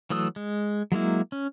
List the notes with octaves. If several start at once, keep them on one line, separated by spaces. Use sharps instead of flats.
E3 F#3 A3 D#6 E6
G#3
F#3 G#3 A#3 E4
C#4